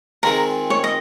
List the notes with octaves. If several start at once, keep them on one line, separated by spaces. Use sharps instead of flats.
D#3 G#3 C4 F4 G#4 A#4
C#5
D#5